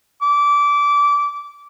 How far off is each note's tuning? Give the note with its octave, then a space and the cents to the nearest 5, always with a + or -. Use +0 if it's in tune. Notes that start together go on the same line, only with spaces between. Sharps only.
D6 -20